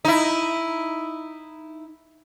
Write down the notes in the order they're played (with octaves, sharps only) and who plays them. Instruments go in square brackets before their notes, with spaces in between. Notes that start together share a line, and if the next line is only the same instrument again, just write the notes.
[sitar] D#4 E4